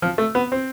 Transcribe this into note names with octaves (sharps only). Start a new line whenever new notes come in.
F3
A3
B3
C4